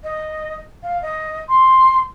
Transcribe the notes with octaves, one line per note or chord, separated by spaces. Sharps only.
D#5
F5
D#5
C6